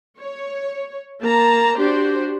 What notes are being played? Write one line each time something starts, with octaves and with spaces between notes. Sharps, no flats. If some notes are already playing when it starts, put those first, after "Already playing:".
C#5
A#3 A5 A#5
D4 F#4 G4 C5